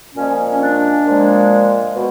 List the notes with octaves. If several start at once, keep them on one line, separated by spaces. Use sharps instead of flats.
A#2 F3 G#3 C#4
C#4
D4
A#2 F3 G#3
B2